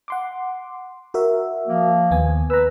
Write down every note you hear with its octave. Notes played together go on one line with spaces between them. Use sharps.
F#5 C6 D6
F#4 A#4 E5
F3 A#3
D#2 B3 G#5
B4 A#5 E6